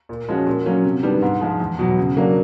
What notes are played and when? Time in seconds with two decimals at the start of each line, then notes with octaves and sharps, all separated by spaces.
0.09 A#2
0.28 F3 G#3 C#4 F#4
0.47 A#2
0.66 F#3 A#3 C#4
0.84 C3
1.03 D#3 G3 B3 D4
1.22 G#2
1.41 F3 G#3
1.60 E2
1.79 B2 F#3
1.98 C#3
2.17 F#3 A#3 D4